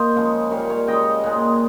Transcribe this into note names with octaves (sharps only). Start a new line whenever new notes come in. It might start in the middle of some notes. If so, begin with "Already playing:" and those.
Already playing: A#3 C5 D#5
C#3 F3 G#3
A#2 G3 A#3 C#5 F5
C#5 F5
C#3 G#3 D#5 G5
A#2 G#3